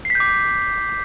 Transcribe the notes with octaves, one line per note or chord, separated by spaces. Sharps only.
C7
B6
G6
D6